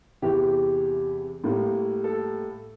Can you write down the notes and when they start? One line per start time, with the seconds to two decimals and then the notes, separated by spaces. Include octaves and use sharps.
0.22 E2 C3 E3 G4
1.44 A2 G3 A#3
2.04 A4